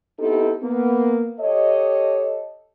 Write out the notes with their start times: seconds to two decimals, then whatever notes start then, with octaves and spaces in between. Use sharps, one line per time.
0.19 B3 C4 D#4 E4 G4 A4
0.63 A#3 B3
1.40 G4 A4 C#5 D#5